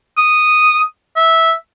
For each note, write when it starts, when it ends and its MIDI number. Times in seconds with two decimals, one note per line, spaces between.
0.17 0.80 87
1.16 1.52 76